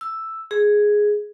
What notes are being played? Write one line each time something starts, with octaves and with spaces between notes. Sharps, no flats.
E6
G#4